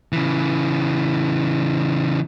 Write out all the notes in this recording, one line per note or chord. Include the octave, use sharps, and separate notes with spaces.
C#3 E3